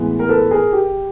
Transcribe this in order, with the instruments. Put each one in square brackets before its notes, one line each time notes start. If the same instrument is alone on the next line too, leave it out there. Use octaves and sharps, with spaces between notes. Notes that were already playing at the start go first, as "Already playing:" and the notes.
Already playing: [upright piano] A2 E3 G#3 B3
A#4
A4 B4
G#4 A#4
G4